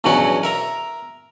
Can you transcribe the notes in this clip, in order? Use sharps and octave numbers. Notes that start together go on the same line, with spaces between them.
E2 G2 B2 F#3 C#4 F#4
A#4 E5 A#5